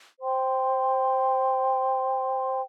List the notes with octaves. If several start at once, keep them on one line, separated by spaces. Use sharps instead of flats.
C5 G5 C6